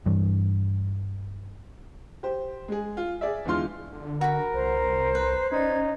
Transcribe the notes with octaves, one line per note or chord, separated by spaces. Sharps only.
G2 E3
G4 C5
G#3 G#4
F4
G#4 D5 E5
E2 D3 G#3 F4 C6 F6
D3
F#4 A#4 B5
C2 C5 A#5
B4
C#4 D#4 C5 D5 G#6